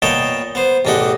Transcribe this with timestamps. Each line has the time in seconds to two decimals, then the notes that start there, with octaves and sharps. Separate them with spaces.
0.02 A#2 B3 C#5 D#5 G5 A5
0.55 B3 C5
0.85 A1 E2 D4 G4 D#5 F#5